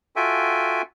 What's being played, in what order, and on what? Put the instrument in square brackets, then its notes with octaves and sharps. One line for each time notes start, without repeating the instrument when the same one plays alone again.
[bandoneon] F4 F#4 A4 E5 G5 G#5